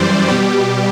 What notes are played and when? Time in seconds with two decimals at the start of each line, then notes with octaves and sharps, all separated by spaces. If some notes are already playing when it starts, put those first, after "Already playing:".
Already playing: F#2 E3 G3 C5 D5
0.28 B2 G3 G4